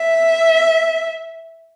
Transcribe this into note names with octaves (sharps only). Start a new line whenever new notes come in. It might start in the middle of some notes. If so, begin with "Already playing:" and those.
Already playing: E5